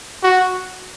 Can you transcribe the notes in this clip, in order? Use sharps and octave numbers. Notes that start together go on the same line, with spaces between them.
F#4